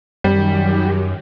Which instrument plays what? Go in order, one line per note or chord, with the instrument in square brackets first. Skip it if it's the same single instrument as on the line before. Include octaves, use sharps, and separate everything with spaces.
[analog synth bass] F#2 [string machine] D#3 F#3 G4 [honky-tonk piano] G3